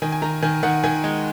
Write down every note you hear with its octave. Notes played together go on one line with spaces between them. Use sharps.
D#3 G#5
G#5
D#3 A#5
D#3 G#5
D#3 F#5
D#3 G#5
G#3